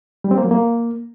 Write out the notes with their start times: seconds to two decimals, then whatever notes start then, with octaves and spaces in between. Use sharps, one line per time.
0.24 G3
0.31 C4
0.38 A#3
0.44 F#3
0.51 A#3